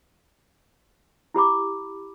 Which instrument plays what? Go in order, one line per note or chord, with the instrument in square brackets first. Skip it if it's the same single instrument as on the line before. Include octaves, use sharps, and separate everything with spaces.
[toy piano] E4 G4 B5 D6